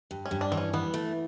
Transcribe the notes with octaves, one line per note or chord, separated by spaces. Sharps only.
G2
C#4
G2
D4
E3 C4
C#4
E3 B3
A3